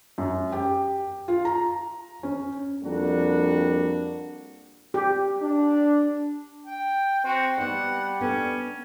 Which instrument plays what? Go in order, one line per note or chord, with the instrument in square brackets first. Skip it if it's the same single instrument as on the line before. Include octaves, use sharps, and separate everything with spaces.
[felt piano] F#2
G4
F4
A#5
C#4
[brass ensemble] F2 G3 A#3 D4 F#4
[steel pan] G4
[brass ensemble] D4
[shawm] G5
[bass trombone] C4 [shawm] F#4
[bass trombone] G3 [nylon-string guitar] B3 D#4 [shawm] F#5
[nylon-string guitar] B3 D4 A4 [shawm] C#4